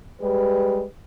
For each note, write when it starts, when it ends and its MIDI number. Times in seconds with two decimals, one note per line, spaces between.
0.21 0.84 55
0.21 0.84 56
0.21 0.84 67
0.21 0.84 71